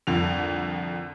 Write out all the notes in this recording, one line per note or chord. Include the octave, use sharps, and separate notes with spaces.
C2 F2 D3 F7